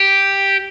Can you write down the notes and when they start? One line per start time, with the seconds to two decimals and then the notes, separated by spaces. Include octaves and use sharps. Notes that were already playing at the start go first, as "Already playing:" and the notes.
Already playing: G4